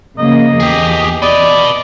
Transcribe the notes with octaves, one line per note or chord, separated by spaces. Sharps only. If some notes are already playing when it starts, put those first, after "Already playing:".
C#3 F3 A#3 D#5
E2 G4 G#4
B4 D5 D#5